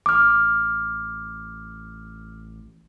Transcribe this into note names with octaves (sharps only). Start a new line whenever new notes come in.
A1 D6 F6